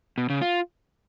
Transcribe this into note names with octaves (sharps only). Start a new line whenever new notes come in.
B2
C#3
F4